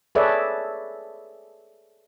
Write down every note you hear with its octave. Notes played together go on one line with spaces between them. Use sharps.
G#4 A4 B4 C#5 D5 E5